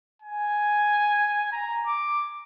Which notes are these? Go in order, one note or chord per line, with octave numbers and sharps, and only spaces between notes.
G#5
A#5
D6